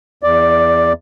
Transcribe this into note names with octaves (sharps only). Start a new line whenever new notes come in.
E2 D5